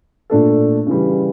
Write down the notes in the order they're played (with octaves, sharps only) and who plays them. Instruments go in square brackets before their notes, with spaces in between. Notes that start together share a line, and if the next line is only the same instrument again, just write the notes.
[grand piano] A#2 A3 D4 A4
C#3 E3 G3